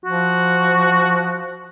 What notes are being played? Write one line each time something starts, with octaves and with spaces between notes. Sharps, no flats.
F3 F#4